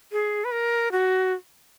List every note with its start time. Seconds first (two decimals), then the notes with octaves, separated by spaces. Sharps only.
0.12 G#4
0.45 B4
0.52 A#4
0.92 F#4